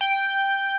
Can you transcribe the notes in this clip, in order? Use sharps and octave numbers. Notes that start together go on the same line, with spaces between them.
G5